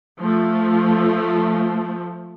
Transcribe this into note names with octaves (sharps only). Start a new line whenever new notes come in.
F3 A3